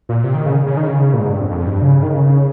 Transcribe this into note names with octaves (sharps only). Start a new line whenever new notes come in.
A#2
C3
D#3
C#3
C#3
D#3
C#3
A#2
G#2
G2
F2
F2
G2
C#3
D#3
C#3